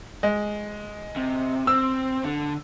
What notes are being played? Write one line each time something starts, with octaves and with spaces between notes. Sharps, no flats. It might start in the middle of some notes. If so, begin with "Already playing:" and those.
G#3
C3
C4 E6
D3